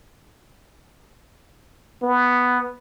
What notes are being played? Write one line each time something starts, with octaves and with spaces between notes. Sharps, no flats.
B3